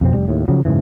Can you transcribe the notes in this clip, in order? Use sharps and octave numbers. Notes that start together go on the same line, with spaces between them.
F2 B2 C4
F1 G3
D#2 A2
C#3 F3 F#3
F#1 G#2 C#3 E3